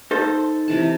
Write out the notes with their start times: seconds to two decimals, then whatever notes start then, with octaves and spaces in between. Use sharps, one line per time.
0.11 D#4 A4 C5
0.68 C3 E3 A5